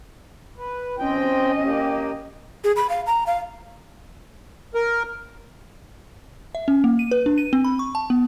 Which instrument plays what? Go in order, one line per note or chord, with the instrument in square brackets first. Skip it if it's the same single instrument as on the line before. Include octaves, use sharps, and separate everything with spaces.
[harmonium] B4
[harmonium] C4 G5 [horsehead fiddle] C#4 D#5
[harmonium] A#3 G4
[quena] G#4
B5
F5
A#5
F5
[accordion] A#4
[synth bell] E5
C#4
A#3
D#7
B4
D4
D#7
C4
B5
C#6
A5
B3